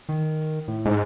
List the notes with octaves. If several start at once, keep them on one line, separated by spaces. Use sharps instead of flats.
D#3
A2
G#2